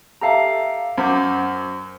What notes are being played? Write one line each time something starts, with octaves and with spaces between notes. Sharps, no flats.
G4 A4 E5 F5 A5 A#5
F#2 C5 F#5 D6